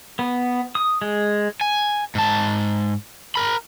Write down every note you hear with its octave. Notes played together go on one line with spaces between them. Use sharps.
B3
D#6
G#3
G#5
G#2 A5
A#4 B5